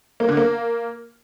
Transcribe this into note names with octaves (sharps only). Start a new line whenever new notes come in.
A#3
D3
A#3